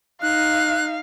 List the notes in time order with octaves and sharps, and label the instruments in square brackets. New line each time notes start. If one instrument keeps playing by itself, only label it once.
[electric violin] D#4 [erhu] F5 [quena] F#6